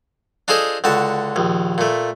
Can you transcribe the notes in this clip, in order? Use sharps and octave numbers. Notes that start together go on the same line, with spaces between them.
D4 F4 G#4 A4 C5 D#5
C#2 D3 F#4 A5
A#1 D#2
A#2 A3